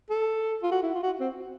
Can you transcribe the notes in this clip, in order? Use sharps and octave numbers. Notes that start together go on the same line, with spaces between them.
A4
F4
F#4
E4
F4
F#4
C4